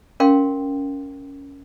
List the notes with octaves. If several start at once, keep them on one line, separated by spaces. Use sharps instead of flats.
C#4 A#4 F5 G5 C6